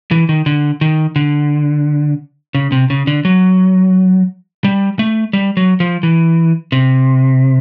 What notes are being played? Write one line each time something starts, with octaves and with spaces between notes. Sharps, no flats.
E3
D#3
D3
D#3
D3
C#3
C3
C#3
D3
F#3
G3
A3
G3
F#3
F3
E3
C3